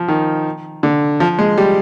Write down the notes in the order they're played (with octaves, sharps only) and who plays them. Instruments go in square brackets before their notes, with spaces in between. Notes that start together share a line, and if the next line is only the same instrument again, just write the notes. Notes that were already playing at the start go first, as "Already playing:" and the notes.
Already playing: [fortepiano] F3
D#3
D3
F3
G#3
G3